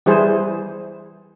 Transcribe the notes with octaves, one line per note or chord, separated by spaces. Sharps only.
E3 G3 E4 G#4 C5